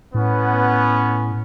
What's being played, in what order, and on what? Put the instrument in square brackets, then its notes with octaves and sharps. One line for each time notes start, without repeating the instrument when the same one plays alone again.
[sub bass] A2 [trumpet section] B3 C#4